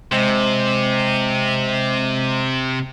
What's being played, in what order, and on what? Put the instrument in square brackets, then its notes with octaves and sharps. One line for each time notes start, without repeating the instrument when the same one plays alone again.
[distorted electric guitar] C3 [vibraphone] G#3 C5 D#5